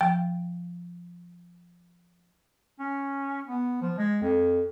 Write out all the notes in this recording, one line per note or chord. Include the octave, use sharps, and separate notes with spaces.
F3 G5
C#4
B3
F3
G#3
F2